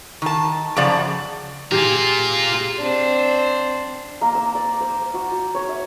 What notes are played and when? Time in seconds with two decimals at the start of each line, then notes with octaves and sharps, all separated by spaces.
0.22 D#3 A5
0.76 F#2 C#3 F3 D5 A5
1.72 F4 G4 G#4 A#4
2.79 C4 D4
4.21 A#3
4.35 E6
4.55 D5
4.81 C5
5.14 F#4
5.31 F#4
5.55 C#5
5.69 E5